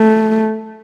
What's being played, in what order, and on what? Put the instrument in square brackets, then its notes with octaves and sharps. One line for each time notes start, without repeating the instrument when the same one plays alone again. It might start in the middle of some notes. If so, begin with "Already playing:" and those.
Already playing: [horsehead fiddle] A3